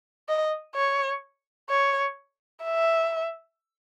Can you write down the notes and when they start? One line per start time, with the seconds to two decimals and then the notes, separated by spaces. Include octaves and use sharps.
0.29 D#5
0.75 C#5
1.70 C#5
2.64 E5